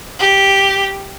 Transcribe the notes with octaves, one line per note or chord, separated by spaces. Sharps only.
G4